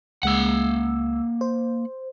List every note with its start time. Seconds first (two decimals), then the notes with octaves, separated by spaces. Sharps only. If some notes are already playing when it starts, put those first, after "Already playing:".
0.23 C#2 G#3 A#3 F#5 E6
1.41 C5